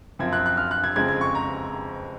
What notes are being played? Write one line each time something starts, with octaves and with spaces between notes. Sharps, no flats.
F#2 F3 C4 G#6
F#6
F#6
F6
F#6
G#6
F2 C#3 G#3 C4 G#6
G#6
C#6
A#5